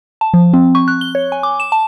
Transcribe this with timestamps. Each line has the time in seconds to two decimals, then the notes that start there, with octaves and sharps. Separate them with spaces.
0.21 A5
0.34 F3
0.54 C4
0.75 C#6
0.88 F#6
1.01 G7
1.15 C#5
1.32 G#5
1.43 D6
1.60 E7
1.72 A5